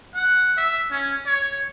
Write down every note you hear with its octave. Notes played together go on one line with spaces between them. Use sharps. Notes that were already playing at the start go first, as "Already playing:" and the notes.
F#5
E5
C#4
C#5